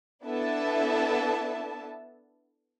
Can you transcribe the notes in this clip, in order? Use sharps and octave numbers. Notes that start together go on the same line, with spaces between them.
B3 D4 E4 A4 E5 A5